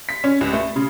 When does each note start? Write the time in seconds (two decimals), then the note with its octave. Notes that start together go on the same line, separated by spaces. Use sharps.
0.09 B6
0.24 C#4
0.41 C#2
0.53 A3
0.76 C#3